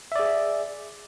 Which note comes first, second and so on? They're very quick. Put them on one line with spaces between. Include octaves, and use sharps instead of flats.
E5 D5 G#4